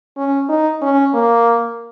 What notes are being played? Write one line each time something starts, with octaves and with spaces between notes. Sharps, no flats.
C#4
D#4
C#4
A#3